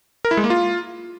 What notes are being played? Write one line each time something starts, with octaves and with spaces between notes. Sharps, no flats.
A#4
E4
G#3
A#3
F4